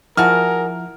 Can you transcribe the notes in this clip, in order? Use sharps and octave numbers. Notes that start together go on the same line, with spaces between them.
F3 E4 F#4 G#4 A#4 A5 F6